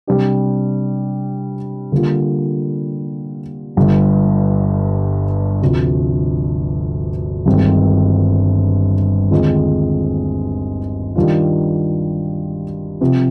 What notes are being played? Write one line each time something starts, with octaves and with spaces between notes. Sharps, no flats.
C3 G3 D4 G4
D3 G3 A#3 F4
G1 G2 D3
D2 C3 F3
G1 G2 D#3 G#3 C4
D#2 D3 G#3 C4 F4
D#3 G3 D4 F4
C3 F3 C4